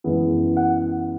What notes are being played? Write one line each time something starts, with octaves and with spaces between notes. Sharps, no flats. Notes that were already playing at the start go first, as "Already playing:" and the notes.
F#2 E3 G#3 B3 E4
F#5